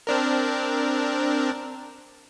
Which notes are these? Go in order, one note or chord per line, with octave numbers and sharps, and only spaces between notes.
C4 D4 A#4